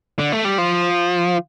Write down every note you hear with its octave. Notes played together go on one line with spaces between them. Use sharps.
D3
A3
G3
F3